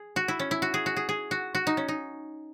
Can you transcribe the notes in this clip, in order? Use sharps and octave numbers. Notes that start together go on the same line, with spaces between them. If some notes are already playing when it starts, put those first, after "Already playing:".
Already playing: G#4
F#4
E4
C#4
E4
F#4
G#4
F#4
G#4
G#4
F#4
F#4
D#4
C#4
D#4